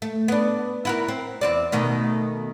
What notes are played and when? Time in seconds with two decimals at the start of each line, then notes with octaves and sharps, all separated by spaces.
0.02 A3
0.28 B3 D4
0.85 E4 F#4 A#4
1.08 C4
1.41 E2 C4 D5
1.72 B2 D#3 A3